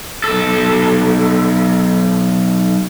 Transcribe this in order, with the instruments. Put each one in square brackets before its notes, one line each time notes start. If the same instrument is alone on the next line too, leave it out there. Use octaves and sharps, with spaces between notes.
[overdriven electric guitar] B1 A4